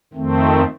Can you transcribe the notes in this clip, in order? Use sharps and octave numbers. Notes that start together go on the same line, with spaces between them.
F2 D#3 A3 C4